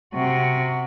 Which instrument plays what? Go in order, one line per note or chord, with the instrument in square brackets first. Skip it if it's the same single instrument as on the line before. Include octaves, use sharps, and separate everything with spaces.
[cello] C3 F#4